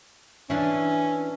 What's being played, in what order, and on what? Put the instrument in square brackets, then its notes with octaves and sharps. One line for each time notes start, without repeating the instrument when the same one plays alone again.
[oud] E3 D4 E4 [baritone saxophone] C#4